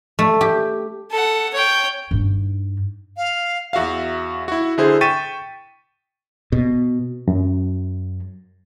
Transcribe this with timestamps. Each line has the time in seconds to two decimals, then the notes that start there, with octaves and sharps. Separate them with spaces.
0.19 A3
0.41 G4
1.10 A4 F#5
1.53 C#5 G5
2.11 G2 D#4
3.17 F5
3.73 E2 F#4 E5 F5
4.48 E4 F#4
4.78 D3 E4 G#4 C5
5.01 G5 C#6 A6 B6 D#7 E7
6.52 B2
7.28 F#2